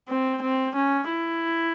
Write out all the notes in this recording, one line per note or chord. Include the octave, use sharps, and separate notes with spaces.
C4
C4
C#4
E4